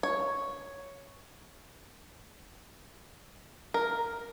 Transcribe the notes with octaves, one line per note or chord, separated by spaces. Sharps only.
C#5
A#4